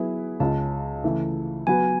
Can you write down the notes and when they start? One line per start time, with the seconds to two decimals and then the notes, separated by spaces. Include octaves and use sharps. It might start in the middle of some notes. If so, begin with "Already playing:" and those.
Already playing: F#3 B3 E4 G#4 B4
0.40 C#2 C#3 G#3 C#4 A5
1.04 C#3 E3 A3
1.67 F#3 B3 F#4 B4 G#5